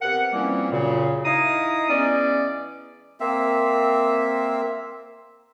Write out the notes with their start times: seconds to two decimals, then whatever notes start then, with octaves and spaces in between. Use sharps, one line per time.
0.02 C3 B3 A#4 F#5
0.33 E3 F3 G3 A#3 C4 C#4
0.71 F#2 A#2 C#3
1.25 D#4 E4 F5 A#5 D#6
1.90 E3 G#3 B3 C#4 D5
3.20 A#3 C4 E5